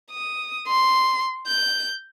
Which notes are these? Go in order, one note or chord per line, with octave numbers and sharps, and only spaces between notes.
D#6
C6
G6